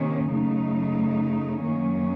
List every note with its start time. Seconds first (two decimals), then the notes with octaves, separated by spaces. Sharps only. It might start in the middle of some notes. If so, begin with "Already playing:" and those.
Already playing: C3 D#3 A#3 C#4
0.29 F#2 C#3 A3 D#4
1.63 F#2 D#3 A#3 C#4